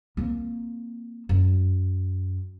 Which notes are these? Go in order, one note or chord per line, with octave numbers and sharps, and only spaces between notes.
A#3 C4
F#2